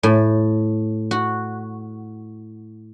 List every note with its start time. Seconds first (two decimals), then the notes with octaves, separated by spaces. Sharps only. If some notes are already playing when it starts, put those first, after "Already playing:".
0.03 A2
1.11 F#4